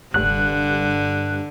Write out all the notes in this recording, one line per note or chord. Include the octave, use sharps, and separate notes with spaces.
F1 G2 D3 F#6